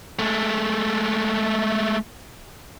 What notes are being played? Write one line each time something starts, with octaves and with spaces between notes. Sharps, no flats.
G#3 A3